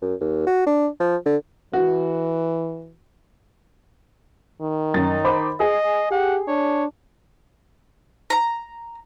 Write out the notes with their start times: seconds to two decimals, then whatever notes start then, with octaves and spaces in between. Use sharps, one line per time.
0.02 F#2
0.21 D#2
0.46 F#4
0.66 D4
1.00 F3
1.26 D3
1.73 E3 F#4
4.62 D#3
4.94 F#2 D#4 A6
5.25 C5 B5 D6
5.60 G#4 D#5
6.11 G4 F#5
6.48 D4 C#5
8.30 A#5